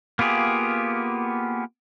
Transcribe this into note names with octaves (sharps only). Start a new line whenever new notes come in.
A#3 B3 F4 G4 G#4